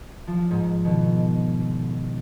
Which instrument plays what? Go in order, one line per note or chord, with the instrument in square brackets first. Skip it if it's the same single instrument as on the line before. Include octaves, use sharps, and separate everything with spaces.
[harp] F3
G#2
B2 D#3